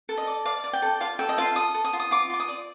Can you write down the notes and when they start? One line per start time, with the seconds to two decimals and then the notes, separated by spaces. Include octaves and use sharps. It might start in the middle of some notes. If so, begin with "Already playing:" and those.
0.09 A4
0.17 D#5
0.27 D5
0.45 D5 F5
0.64 D5
0.73 G5
0.82 A4
1.00 F4 F5
1.19 A4 G5
1.29 D#5
1.38 F4 F5
1.56 A4 D#6
1.74 A4
1.84 D#6
1.93 F4
2.00 D#6
2.11 F4 D6
2.30 F4 D6
2.40 D#6
2.48 D5